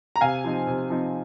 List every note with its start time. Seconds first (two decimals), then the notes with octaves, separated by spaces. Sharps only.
0.16 A#5
0.21 C3 F5 G#5
0.44 F3 C4 D#4
0.67 C3
0.90 F3 C4 D#4